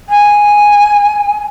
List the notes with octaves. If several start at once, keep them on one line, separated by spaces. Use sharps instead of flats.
G#5